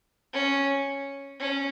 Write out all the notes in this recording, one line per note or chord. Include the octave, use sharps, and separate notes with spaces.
C#4
C#4